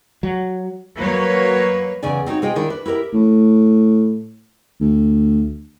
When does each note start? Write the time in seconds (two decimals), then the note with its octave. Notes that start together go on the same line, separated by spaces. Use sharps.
0.23 F#3
0.98 F#3 A#3 B4 C#5
2.02 E2 C#3 G#4 D5 G#5
2.26 C4 D#4 F#4 C#5
2.42 C3 F4 G#4 D#5 G5
2.56 D#3 D4 E4
2.70 B4
2.86 E4 G4 A#4 E5
3.14 A2
4.81 D2